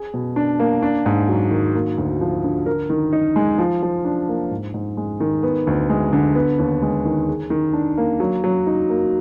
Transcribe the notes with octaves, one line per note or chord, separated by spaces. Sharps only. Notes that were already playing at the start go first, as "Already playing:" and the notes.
Already playing: G#4
B2
D4
A#3
D4
G#2
F#3
D#3
A#3
D2
F3
D3
A#4
D#3
D#4
G#3
F3
F3
D4
A#3
G#2
G#2
G#3
D#3
B3
D2
G#3
D3
B3
D#2
G#3
D#3
G#4
D#3
D4
A#3
F#3
F#3
D#4
A#3